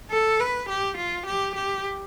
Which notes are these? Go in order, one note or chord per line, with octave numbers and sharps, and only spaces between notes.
A4
B4
G4
F4
G4
G4